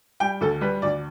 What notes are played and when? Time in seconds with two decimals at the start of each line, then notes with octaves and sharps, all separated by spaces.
0.20 G3 G5
0.41 D2 A4
0.61 G3 B4
0.82 D2 D5